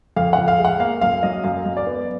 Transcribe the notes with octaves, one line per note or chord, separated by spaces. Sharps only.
F2 F5
F#5
F2
F5
G#3
F#5
A#3 F5
F#2 F5
F#3 D#5
F#2 F5
F#2
D5
B3